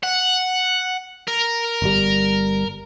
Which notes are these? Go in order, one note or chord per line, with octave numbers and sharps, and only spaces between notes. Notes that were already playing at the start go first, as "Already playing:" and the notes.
F#5
A#4
G1 G3